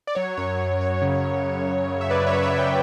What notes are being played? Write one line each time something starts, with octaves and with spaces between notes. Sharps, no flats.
D5
F#3 C#5
F#2 C#5
F#3
F#2 C#5
C#3
F#3
F#2
F#3
C#3
E5
F#2 B4 D5
C#5 E5
F#3
C#5 E5
F#2
E5 G5